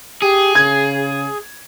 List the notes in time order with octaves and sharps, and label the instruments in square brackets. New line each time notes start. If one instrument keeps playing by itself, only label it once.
[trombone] G4 [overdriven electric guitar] G#4
[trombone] C#3 [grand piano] G#6